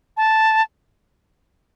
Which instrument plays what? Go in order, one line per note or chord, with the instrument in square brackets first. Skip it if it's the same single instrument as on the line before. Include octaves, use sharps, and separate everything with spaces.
[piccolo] A5